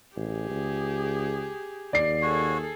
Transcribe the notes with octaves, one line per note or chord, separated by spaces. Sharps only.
A1 G4 G#4
C#2
D#2 D5 C7
F#4 G#4 A4 C#5